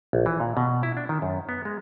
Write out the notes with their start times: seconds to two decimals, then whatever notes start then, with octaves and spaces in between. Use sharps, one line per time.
0.13 A#1
0.26 E3
0.40 A#2
0.57 B2
0.83 E4
0.97 D4
1.09 D#3
1.22 F#2
1.49 B3
1.65 G#3